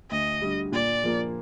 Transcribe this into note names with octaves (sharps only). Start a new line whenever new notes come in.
D2 D#5
D3 G3
A#2 D5
F3 A#3